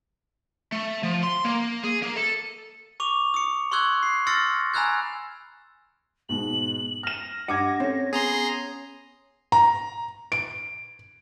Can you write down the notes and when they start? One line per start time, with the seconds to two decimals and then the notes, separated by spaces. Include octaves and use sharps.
0.72 A3
1.03 F3
1.23 C6
1.44 A#3
1.84 G#4
2.03 A#3
2.17 A4
3.00 C#6 D6 F7
3.34 D#6 C#7
3.71 C6 C#6 E6 F#6 G#6
4.03 C7
4.27 C6 E6 F6 A6 A#6 C#7
4.74 G#5 A#5 B5 E6 F#6 G#6
6.29 G#2 B2 F#7
7.03 F6 A#6 E7
7.48 G2 D#5 F#5 D6 G#6
7.80 C4 C#4 A4
8.13 B3 G#4 A#5 C6
9.52 A#5
10.32 D7